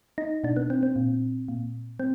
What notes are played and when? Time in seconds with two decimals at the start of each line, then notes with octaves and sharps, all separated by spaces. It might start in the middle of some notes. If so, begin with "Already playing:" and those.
0.18 D#4
0.44 B2 D4
0.56 B3
0.70 C4
0.83 C4
0.96 A#2
1.48 A#2
2.00 C4